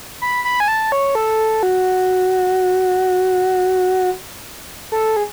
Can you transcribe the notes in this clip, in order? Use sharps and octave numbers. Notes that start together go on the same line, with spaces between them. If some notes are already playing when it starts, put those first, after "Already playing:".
B5
B5
G#5
A5
C#5
A4
F#4
A4
G#4